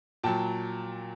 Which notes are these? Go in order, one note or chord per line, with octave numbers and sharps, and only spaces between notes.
A#2 F#3 G5 A5